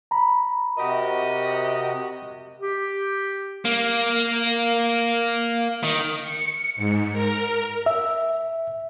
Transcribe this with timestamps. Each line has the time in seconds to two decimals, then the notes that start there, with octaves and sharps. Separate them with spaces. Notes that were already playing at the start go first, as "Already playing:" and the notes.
0.11 A#5 B5
0.78 C3 F#4 G4 A#4 D#5
2.59 G4
3.65 A#3
5.84 D#3
6.23 C#7
6.76 G#2
7.13 A#4
7.86 E5